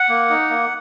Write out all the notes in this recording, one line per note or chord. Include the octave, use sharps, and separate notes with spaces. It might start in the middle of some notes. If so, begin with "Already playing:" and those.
Already playing: F#5
A#3
D#4
A#3